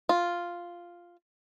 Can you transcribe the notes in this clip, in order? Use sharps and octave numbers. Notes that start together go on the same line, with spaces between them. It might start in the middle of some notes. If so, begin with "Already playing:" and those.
F4